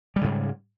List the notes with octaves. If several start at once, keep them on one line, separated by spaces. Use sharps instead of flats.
G#2 C#3 G3 G#3